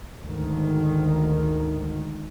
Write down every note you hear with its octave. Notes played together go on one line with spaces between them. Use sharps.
D2 G#2 D#3